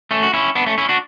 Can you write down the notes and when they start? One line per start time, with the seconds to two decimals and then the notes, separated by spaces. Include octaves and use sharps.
0.11 A3 C#4
0.23 F#4
0.33 C#4 E4
0.55 B3 D4
0.66 A3 C#4
0.78 C#4 E4
0.89 D4 F#4